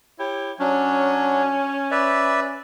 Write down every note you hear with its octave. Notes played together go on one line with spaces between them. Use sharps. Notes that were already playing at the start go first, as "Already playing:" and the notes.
E4 G4 C#5
F#3 C#4 D4
B4 D5 E5